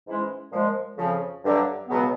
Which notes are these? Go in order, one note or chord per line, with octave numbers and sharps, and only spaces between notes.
G#2 E3 G#3 C#4 E4
A#2 F3 G#3
F2 C#3 F3
G2 D3 F#3 A3
C#2 B2 F#3 B3